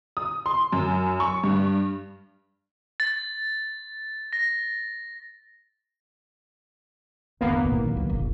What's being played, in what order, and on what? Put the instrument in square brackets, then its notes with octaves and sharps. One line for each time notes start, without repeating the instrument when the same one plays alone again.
[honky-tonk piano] D#6
C6
F#2
C#6
G2
[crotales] A6
A#6
[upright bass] G1 E2 [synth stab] A#3 B3
[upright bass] G#1 A#2
C2 F#3
C#2
F1 A#1